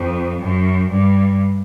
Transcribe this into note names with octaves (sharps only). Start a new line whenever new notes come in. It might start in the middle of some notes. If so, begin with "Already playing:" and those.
Already playing: F2
F#2
G2